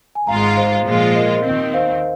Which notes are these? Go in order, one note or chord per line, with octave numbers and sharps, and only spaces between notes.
G#5
G#1 G#2 G#3 F4 F5 A#5
C5 F5
A#2 F3 G#3 F4
A#4 D#5
D#2 D#3 C4
C5 F5